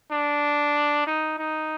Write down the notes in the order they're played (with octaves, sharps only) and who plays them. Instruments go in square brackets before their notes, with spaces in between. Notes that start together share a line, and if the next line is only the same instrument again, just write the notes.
[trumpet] D4
D#4
D#4